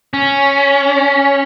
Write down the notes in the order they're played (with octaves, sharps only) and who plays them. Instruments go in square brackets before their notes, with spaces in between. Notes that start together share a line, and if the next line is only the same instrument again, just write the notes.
[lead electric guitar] C#4